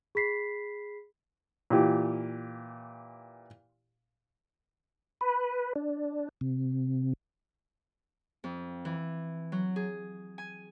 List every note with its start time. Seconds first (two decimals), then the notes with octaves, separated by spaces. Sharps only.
0.15 G#4 B5 B6 C7
1.70 A#2 E3 G4
5.21 B4
5.76 D4
6.41 C3
8.44 F2
8.85 E3
9.52 F#3
9.76 G#4
10.38 G#5